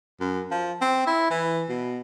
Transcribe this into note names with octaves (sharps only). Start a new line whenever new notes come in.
F#2
F3
C4
E4
E3
B2